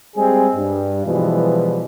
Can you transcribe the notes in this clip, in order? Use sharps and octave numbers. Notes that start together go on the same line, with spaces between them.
G3 G#3 C4 G#4
G2
B2 E3 F3 G3 G#3